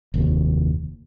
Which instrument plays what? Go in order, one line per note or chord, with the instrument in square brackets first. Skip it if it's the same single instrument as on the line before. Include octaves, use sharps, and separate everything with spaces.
[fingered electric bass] F1 D#2